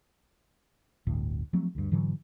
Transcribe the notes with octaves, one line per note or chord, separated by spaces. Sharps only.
D1 G1 D2 A2
F3 F#3 A3 C4
D2 G2
G#2 D3 E3 F#3